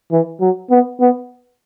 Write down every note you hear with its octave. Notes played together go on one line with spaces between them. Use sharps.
E3
F#3
B3
B3